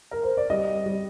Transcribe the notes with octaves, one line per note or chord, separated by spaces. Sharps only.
A#4
C5
D5
G3 D#5
G3